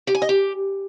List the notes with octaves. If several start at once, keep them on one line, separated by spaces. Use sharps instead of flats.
G4
G#5
D#5
G4